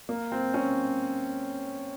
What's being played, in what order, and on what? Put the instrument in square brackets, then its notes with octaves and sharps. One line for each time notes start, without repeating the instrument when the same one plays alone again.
[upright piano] A#3
C4
C#4